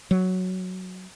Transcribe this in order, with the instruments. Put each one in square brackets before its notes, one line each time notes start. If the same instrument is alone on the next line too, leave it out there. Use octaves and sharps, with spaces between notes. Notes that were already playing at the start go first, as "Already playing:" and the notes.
[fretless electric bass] F#3